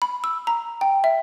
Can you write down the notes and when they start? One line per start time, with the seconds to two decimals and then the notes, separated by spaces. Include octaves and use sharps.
0.02 B5
0.24 E6
0.47 A#5
0.81 G5
1.04 E5